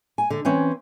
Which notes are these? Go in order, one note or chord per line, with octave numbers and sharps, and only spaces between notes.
G#5
D3
E3 C4 C#4